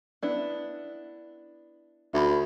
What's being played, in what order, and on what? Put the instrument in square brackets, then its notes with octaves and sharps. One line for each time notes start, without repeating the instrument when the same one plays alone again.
[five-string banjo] B3 D4 E4
[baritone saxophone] D2 [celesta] E5 B5